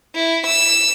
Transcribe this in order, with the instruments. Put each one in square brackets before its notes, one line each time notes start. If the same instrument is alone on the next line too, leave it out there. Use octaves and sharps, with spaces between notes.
[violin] E4
E6